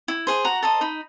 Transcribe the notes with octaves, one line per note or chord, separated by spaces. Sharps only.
E4
G#4 C5
F#4 A#5
A4 C5 D#5
D#4 B5